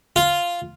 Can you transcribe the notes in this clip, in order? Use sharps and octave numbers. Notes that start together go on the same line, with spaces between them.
F4